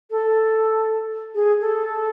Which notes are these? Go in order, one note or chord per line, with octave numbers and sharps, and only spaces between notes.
A4
G#4
A4